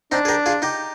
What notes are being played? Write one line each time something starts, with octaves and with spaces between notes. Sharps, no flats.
C4 D4 D#4
G#4
G4 A#4
F4 G#4
D#4 G4